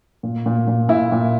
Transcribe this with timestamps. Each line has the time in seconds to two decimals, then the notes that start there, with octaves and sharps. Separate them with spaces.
0.23 A#2
0.46 A#2
0.68 A#2
0.89 A#2 E4
1.12 A#2